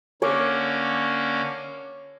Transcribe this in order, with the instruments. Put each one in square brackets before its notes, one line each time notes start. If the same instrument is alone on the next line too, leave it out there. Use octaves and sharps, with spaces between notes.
[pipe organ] D3 A#3 C#4 [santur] C#5 C#6 D6